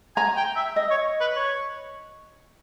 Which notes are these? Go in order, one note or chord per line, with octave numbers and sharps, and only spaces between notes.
G#5 A#5
G5
E5
D#5
C#5
B4
C#5